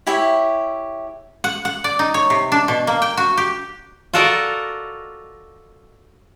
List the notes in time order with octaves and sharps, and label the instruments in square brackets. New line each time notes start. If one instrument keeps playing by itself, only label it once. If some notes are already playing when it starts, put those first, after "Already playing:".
[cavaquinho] E4 G4 C#5 E5
[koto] F#5
F#5
D5
D#4
C#5
C3
D4
B2
A#3
G5
F#4
G4
F4 F#4 A4 A#4 D5 D#5